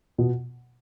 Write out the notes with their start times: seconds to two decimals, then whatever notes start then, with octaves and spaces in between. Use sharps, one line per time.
0.18 B2